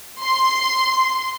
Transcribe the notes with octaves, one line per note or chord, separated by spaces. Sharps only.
C6